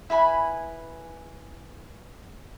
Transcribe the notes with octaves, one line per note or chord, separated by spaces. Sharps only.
E4 B4 G#5 B5